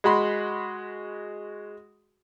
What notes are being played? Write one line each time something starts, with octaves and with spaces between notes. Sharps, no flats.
G#3 F#4 B5 C6